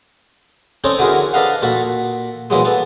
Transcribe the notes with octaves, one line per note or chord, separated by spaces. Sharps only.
C4 C#4 D#4 A4 C#5 D5
D3 E4 F#4 G#4 A#4
D4 A4 B4 D#5 F5 F#5
A#2 F#4 A4 B5
A#2 E3 F#3 G#3
B3 A4